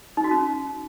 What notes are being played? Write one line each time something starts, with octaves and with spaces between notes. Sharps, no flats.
D#4
F#4
C#4